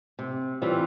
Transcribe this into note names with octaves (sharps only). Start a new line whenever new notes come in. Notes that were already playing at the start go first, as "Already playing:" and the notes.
C3
E3 G3 C4 F4